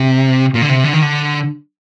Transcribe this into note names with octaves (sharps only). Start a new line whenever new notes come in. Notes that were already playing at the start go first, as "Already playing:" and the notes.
Already playing: C3
A#2
D3
C3
D3
D#3
D3